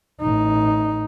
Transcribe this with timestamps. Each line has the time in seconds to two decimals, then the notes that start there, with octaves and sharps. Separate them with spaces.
0.21 A1 D#4